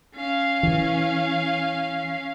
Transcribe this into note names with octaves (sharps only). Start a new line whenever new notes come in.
C#4 F5
E3